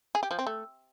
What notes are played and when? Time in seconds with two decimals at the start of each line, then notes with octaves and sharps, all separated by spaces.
0.15 G#4
0.23 G4
0.31 F3
0.39 C4
0.47 A3